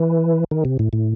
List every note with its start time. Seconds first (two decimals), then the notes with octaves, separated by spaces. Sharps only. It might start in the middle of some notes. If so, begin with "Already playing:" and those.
Already playing: E3
0.51 D#3
0.65 C3
0.79 A2
0.93 A2